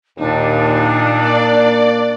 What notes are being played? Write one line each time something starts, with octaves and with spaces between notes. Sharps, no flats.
D#2 A#2 D4 D#4
A#3 D5